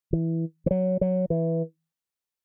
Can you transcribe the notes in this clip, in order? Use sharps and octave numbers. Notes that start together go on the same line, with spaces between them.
E3
E3
F#3
F#3
E3